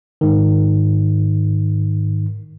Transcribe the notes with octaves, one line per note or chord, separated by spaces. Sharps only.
G#2 D#3